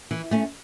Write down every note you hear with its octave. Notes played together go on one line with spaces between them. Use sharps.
E3
A3 C#4